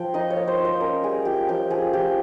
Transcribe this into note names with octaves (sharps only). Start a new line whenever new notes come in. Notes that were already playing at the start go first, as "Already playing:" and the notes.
Already playing: F3 F4 G5
D#4 D#5
C#5
A#3
C5
D#4
C5
C#4 A#4
G3 G#4
F4 G4
F3 G4
F3 G#4
F3 G4